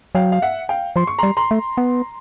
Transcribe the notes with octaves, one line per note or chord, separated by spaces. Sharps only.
F#3 F5 G5
F5
E5 F#5
F5 G5
F3 C6
C#6
G3 A#5 C6
A#5 C6
A3
B3